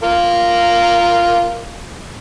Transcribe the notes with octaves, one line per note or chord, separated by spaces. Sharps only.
A#3 F4 A#4